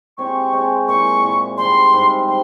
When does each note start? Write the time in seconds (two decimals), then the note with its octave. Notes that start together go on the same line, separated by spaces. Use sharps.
0.18 G#3 C4 G4 C#5 C#6
0.53 G#3 C4 G4 C#5
0.88 A#2 G#3 E4 C#6
1.23 A#2 G#3 E4
1.57 G#2 G3 C4 C6
1.93 G#2 G3 C4
2.28 G3 C4 C6